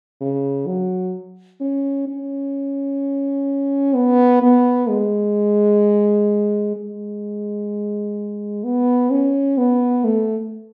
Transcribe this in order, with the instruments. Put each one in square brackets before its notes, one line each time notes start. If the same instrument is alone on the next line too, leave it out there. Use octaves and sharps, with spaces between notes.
[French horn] C#3
F#3
C#4
C#4
B3
B3
G#3
G#3
B3
C#4
B3
A3